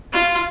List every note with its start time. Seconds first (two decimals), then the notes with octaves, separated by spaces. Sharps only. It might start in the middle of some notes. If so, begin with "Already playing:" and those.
0.13 F4